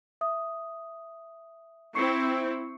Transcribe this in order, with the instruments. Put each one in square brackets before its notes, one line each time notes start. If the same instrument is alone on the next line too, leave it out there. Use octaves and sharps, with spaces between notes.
[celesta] E5 D#6
[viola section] C4 E4 [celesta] C#6 C7 C#7